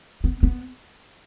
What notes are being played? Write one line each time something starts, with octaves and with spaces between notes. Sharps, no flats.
B3
B3